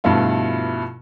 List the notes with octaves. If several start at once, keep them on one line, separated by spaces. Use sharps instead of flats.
G2 B2 F3 A3 E4 F4